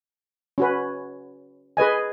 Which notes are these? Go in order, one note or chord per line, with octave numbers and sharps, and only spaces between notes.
C#4 F#4 B4
G#4 B4 D#5 G#5